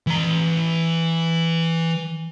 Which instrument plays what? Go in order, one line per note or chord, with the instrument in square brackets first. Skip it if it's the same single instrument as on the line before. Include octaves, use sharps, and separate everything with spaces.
[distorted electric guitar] E3 A#5